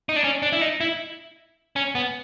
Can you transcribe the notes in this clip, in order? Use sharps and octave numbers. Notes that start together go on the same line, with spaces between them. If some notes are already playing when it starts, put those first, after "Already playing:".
D#4
D4
C#4
D4
E4
D#4
E4
C#4
B3